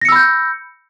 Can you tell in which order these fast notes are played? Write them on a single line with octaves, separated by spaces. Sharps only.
A#6 C#7 E6 B5 G6